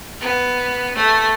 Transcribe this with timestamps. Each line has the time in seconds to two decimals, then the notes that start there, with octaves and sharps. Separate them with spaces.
0.21 B3
0.95 A3